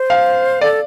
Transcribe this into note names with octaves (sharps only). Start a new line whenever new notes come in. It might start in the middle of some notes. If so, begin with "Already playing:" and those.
Already playing: C5
F5
A4 D5